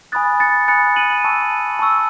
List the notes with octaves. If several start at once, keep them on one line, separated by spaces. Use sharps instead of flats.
G#5 B5 D#6 F#6 A6
A6 C#7
G#5 B5 D#6 F#6 A6 C#7
D#7 F#7
A5 C#6 E6
A5 C#6 E6